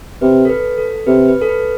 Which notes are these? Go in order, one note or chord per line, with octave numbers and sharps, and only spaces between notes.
C3 B4
A4
B4
A4
C3 B4
B4
A4
B4